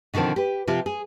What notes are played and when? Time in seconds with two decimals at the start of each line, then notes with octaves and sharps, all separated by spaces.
0.14 B2 D3 D#3 F3 C4
0.36 G4 B4
0.67 C3 F3 F4 G4
0.86 G#4